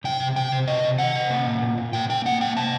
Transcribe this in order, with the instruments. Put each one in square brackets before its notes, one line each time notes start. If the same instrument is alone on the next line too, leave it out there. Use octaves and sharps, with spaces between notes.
[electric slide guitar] C3 G5
C3
C3 G5
C3
C3 D#5
C3
D#3 F#5
C3
A#3
A#2
A#2
A#2
A#2 G5
A#3 G5
A#3 F#5
A#2 G5
C3 A5